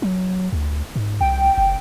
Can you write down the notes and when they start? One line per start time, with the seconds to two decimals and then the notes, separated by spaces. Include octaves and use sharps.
0.02 F#3
0.53 D2
0.96 G#2
1.21 C2 G5
1.58 F#1